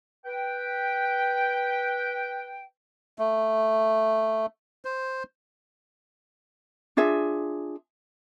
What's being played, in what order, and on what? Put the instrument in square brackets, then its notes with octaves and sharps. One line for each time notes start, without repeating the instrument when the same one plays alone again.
[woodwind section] B4 G5
[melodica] A3
C5
[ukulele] D4 F4 G#4 E5